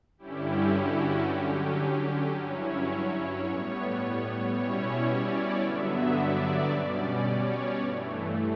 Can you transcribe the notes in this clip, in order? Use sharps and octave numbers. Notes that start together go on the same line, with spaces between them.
G2 D3 G3 C#4 E4 G4
F#4
D3 F#3 C#4 G4
G2 F#3 C#4 E4 C#5
A2 G3 B3 C#5
B2 G3 C#4 E4 C#5
D5
G2 D3 F#3 B3 E5
D5
B2 G3 C#4 D5
C#5
G2 E3 A3